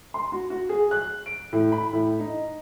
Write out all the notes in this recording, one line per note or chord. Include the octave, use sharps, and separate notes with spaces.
C6
F#4
F#4
G#4
F#6
D7
A2
B5
A2
D#4